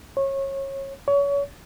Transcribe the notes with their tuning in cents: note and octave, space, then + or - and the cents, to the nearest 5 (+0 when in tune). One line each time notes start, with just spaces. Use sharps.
C#5 -25
C#5 +30